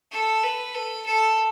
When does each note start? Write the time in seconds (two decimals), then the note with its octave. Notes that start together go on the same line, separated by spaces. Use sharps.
0.12 A4
0.43 B4
0.75 A4
1.05 A4